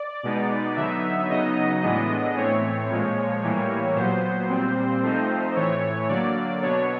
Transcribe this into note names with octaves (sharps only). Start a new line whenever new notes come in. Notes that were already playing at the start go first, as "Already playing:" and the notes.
Already playing: D5
B2 G#3 B3 D#4
D3 F#3 B3 D#4 E5
C#3 F#3 B3 D#4 D#5
A2 E3 G#3 B3 D4 D#5
A2 E3 A3 C4 C#5
A#2 F3 G#3
A2 E3 G3 A#3
A#2 F#3 B3 C5
A#2 G3 C4
F3 A3 C4 D#4
A2 E3 A3 C#5
D3 F#3 A#3 D5
B2 F#3 B3 D4 C#5